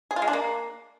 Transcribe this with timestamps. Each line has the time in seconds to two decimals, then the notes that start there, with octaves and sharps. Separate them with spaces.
0.11 G#4
0.16 F4
0.22 G#3
0.28 D4
0.33 A#3